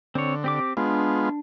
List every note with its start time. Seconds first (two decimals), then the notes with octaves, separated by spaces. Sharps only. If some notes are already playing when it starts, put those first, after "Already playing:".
0.15 D3 C4 C#5
0.44 C4 G4 D6
0.77 G#3 B3 D4 F4